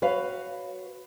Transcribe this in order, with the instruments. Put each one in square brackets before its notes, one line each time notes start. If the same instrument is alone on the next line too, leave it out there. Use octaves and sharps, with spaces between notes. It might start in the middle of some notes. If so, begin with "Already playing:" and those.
[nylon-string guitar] F#4 B4 C#5 F5